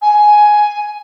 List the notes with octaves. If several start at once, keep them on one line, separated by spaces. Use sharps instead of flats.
G#5